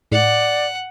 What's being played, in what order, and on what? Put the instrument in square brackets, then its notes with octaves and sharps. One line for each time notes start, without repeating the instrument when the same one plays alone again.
[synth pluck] A2 [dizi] D5 [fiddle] F#5